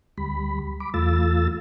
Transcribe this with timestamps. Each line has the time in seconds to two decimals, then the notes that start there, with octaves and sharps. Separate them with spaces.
0.18 D2 G3 B5
0.80 B5 D6
0.94 E2 A3 F4 E6 A6